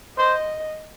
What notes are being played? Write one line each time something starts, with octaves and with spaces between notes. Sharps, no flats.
C5 D#5